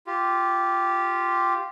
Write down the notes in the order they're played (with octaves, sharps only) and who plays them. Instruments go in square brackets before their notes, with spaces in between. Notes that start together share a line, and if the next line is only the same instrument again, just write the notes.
[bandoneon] F4 G4